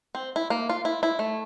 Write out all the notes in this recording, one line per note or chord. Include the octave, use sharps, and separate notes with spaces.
C4
E4
A#3
F4
E4
E4
A3